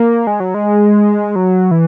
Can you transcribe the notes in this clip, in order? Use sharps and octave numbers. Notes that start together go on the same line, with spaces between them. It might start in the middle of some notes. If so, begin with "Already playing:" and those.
Already playing: A#3
G#3
F#3
G#3
F#3
E3